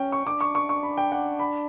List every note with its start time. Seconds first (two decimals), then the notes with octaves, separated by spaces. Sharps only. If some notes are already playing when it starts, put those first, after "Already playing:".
Already playing: C#4 G5
0.12 C#6
0.26 D4 D6
0.41 C#6
0.55 C#6
0.69 C#6
0.83 B5
0.98 G5
1.12 F#5
1.39 B5